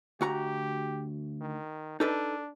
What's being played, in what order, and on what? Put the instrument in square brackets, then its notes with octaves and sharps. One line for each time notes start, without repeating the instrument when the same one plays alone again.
[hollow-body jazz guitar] D2 F#4 A#5 [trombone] G4
[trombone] D#3
[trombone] D4 [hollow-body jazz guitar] D#4 A4 B4